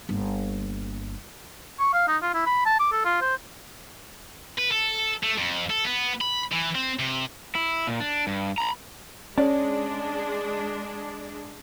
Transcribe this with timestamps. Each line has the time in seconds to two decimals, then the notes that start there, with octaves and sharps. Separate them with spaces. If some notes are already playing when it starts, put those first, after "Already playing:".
0.09 G1 A#3
1.79 C#6
1.93 F5
2.08 D#4
2.22 F4
2.34 E4
2.46 B5
2.65 A5
2.79 D6
2.92 A4
3.04 F4
3.21 C5
4.58 B4
4.71 A4
5.23 A3
5.38 F2
5.70 A4
5.85 B3
6.21 B5
6.52 E3
6.75 C4
6.99 C3
7.55 E4
7.87 A#2
8.00 D4
8.27 G2
8.58 A#5 B5
9.38 G#3 C#4 D4 D5 A5